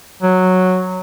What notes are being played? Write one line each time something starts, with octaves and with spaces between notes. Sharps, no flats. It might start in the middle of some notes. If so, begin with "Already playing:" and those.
F#3